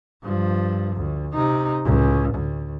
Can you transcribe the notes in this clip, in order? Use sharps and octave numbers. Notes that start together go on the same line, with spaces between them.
G2 F3
D2
C3 D#4
C#2 A2
D2